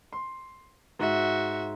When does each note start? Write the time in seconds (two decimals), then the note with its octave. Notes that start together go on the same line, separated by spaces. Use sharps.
0.13 C6
0.99 G#2 F#4 E5